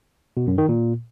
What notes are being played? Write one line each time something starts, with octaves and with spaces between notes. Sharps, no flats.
B2
F#2
D#3
A#2